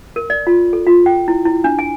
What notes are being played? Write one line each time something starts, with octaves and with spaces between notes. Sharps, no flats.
A#4
D5
F4
A4
F4
G5
E4
E4
D4
G#5